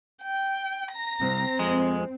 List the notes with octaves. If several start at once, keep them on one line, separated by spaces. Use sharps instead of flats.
G5
A#5 A#6
C2 C4
F2 G#3